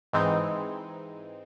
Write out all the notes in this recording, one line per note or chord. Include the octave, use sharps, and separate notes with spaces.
G#2 E3 G#3 C4 D#4